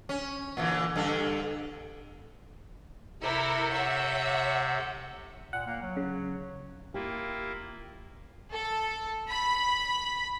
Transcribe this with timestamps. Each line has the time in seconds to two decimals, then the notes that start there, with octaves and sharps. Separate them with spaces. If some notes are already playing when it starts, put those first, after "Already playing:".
0.09 C#4
0.57 A#2 D3 E3
0.96 G2 D3 A4
3.22 C3 E4 A4 A#4 E5
3.72 C#5 E5 F#5
5.53 A#2 F#5
5.67 A#3
5.83 F#3
5.97 C#3
6.94 A#3 E4 F4 G4
8.51 A4
9.30 B5